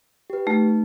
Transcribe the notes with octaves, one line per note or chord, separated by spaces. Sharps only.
G4 B4
A3 D#4